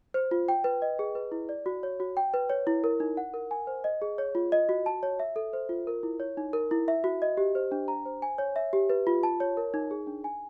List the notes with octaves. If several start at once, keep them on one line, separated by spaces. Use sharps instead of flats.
C5
F4
G5
B4
D#5
G#4
B4
E4
D5
F#4
C#5
F#4
G5
B4
C#5
E4
A#4
D#4
F#5
A#4
G#5
C5
D#5
G#4
C#5
F4
D#5
F#4
A5
C#5
E5
A4
C5
F4
A#4
E4
C#5
D#4
A#4
E4
E5
F#4
D#5
G4
C5
D4
A#5
C5
G#5
C#5
E5
G4
B4
F4
A5
C#5
A#4
D#4
G#4
D4
G#5